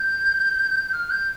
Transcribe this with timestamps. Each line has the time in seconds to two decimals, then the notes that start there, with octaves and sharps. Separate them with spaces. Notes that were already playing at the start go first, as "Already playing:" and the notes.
Already playing: G6
0.93 F6
1.10 G6